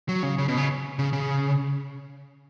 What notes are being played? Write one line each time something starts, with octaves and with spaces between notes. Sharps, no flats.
F#3
C#3
C#3
B2
C#3
C#3
C#3